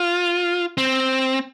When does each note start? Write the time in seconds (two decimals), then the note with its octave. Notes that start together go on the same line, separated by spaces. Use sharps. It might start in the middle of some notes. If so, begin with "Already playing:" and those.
Already playing: F4
0.78 C4